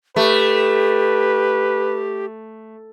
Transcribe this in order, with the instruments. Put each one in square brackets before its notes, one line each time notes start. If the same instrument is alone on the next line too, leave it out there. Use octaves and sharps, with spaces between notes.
[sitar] A3 [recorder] G4 [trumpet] B4